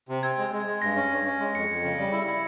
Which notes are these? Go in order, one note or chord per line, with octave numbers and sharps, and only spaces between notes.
C3
C4 G#6
G#3
G#3
G#3
G2 A#6
C#4
G2
C#4
G#3
F2 C#7
F2
C#3
G3
E4
E4